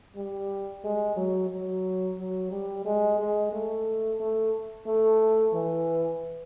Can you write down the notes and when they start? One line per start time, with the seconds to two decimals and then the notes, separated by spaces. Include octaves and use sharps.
0.16 G3
0.84 G#3
1.16 F#3
1.50 F#3
2.18 F#3
2.51 G3
2.85 G#3
3.19 G#3
3.53 A3
4.20 A3
4.87 A3
5.54 E3